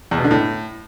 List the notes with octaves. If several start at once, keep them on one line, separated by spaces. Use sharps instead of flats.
E2
B2
D3
A2